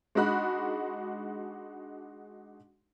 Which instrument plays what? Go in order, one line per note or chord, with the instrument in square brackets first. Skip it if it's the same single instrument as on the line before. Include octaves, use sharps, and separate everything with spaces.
[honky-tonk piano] G#3 D4 D#4 F#4 B5 F#6